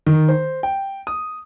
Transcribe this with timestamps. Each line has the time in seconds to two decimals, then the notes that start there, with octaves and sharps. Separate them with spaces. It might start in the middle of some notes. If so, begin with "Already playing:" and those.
0.07 D#3
0.28 C5
0.63 G5
1.07 D#6